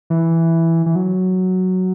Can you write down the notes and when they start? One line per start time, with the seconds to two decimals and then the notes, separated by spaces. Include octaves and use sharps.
0.10 E3
0.86 E3
0.96 F#3